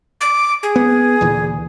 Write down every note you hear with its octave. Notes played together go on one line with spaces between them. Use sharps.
D6
G#4
B3
D2 A#2 E3